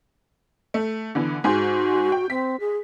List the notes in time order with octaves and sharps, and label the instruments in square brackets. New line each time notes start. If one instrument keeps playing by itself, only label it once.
[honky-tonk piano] A3
D3 E3 B3
[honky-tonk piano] G#2 G#4 C6 [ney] F#4
[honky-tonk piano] G5
[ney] C4 [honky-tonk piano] B6
[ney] G#4